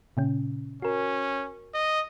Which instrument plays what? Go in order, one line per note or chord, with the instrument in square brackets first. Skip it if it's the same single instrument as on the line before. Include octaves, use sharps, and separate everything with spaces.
[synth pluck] A#2 C#3 C#4
[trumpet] C#4 [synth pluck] F#4 A#4
[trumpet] D#5